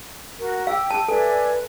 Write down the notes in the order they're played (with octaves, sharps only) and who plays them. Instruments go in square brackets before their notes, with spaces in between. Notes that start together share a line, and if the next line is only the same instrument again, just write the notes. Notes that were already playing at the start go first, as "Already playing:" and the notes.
[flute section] F#4 A#4
[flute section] G4 G5 E6 [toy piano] F5
[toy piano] A5
[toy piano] A4 [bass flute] B4 [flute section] D5 E5 G#5